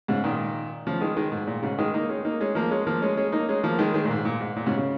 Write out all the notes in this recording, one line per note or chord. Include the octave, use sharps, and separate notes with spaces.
G#2 C#3
A#2 D#3
C#3 F3
D#3 G#3
D#3 G#3
G#2
A#2
G#2 C#3
D#3 G#3
A#3 D#4
G#3 C#4
A#3 D#4
G#3 C#4
F3 A#3
G#3 C#4
F3 A#3
G#3 C#4
G#3 C#4
A#3 D#4
G#3 C#4
F3 A#3
D#3 G#3
D#3 G#3
A#2
G#2
A#2
G#2
A#2
G#2 C#3
C#3